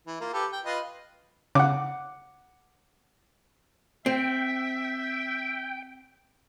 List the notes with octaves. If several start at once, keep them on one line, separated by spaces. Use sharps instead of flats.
E3
A#3 F4
G4 A4 B4
G5
F4 B4 D#5
C#3 F#5 D6
C4 E5 G5